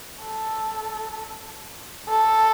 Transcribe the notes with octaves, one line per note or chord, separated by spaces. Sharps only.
A4
A4